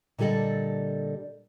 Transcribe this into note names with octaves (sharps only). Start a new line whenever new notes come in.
A#2 D3 G3 A4 D5 D#5